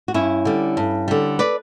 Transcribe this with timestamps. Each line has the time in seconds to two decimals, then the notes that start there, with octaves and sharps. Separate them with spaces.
0.08 F#4
0.14 G2 C#4 E4
0.45 D3 G3
0.77 G2
1.08 D3 G3
1.39 B4 D5